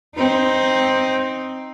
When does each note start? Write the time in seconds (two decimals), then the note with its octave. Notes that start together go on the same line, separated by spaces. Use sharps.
0.15 C4 D#4